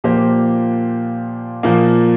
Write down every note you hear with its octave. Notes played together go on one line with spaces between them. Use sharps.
A#2 F3 A#3 G4 C5
A#2 F3 A#3